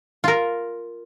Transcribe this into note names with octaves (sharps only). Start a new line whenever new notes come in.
F4 A#4